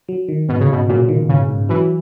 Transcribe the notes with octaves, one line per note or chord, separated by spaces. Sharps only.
F#3
D#3
G#2 B2
C#3
G#2 B2
A#2 F#3
D#3
G#2 C#3
G#2
E3 F#3